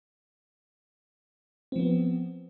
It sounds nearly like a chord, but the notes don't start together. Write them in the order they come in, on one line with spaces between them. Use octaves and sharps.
C4 F3 B3